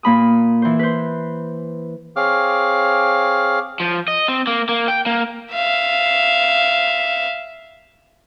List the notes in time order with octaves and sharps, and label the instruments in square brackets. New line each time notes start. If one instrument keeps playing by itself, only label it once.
[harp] A#2 A#3 B5 D#6
E3 C5
B4 C5
[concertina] C4 G#4 C#5 F5 D6 F6
[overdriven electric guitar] F3
D#5
C4
A#3
A#3
G5
A#3
[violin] E5 F5